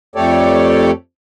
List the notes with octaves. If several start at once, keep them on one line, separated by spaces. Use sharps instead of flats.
F2 A3 G4 A4 C#5 D5